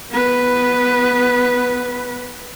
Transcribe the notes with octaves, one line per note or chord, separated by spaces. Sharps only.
B3 B4